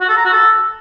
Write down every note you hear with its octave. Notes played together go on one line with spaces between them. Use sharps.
F#4
A4
A#5
F#4
A4